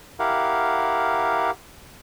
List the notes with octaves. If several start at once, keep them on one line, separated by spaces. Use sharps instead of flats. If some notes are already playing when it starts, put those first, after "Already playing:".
E4 G4 A#4 F5 F#5